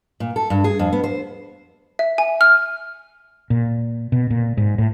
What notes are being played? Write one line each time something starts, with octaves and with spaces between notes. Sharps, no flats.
A#2
A4
G2
G#4
F2
B3
C5
E5
G#5
F6
A#2
B2
A#2
G#2
A2